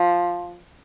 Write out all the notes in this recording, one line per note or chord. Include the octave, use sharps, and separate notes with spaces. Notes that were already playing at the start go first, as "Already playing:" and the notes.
Already playing: F3